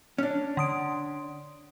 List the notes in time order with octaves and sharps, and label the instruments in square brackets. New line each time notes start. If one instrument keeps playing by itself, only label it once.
[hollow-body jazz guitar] C#4 D4
[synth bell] D3 D#6 D7